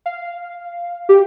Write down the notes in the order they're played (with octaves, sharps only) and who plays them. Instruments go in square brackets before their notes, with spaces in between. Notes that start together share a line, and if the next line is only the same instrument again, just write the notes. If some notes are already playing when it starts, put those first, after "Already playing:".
[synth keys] F5
G4